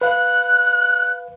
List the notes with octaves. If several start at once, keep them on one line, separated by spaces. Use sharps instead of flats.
B4 F5 F#6